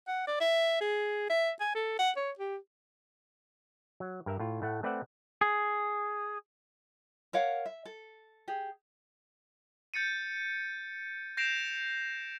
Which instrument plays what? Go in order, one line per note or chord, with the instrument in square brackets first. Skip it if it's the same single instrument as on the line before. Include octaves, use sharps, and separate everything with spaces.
[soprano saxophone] F#5
D5
E5
G#4
E5
G#5
A4
F#5
C#5
G4
[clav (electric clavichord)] F#3
G2 A#4 E5
A2 F4
A2 A3 F#5
A3 C4 B4 D5 E5 F#5
[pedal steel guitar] G#4
[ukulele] A#4 C#5 F5 F#5
E5
A4
G4 G#4
[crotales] G6 A6 C#7 D#7
G6 A#6 C7 D7 E7 F7